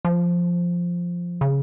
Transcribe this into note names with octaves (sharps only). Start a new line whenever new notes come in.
F3
C#3